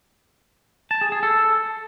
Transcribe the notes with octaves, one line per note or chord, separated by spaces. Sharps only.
A5
G#4
G#4
A4